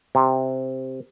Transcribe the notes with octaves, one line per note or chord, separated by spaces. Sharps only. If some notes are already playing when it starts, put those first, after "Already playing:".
C3